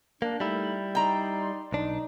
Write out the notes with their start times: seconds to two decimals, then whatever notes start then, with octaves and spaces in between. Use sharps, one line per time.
0.22 A#3 D4
0.40 G3 A3 D#4 E4
0.95 D#4 D5 G5 A#5 C6
1.72 B1 D4 D#4